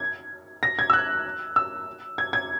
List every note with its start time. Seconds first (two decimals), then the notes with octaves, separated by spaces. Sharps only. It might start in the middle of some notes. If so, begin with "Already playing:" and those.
Already playing: G#6
0.63 A#6
0.79 G#6
0.90 E6
0.93 F#6
1.56 E6
2.18 G#6
2.33 G#6